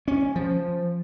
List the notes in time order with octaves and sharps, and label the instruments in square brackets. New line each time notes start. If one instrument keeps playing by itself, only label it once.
[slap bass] C#4
F3